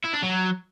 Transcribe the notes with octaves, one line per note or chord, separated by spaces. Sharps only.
E4
D4
F#3